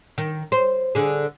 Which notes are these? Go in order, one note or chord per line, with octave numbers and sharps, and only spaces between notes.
D#3
C5
D3 G#4